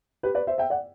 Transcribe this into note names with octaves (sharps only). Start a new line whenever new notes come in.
G4 B4
B4 D5
C5 E5
E5 G5
D5 F#5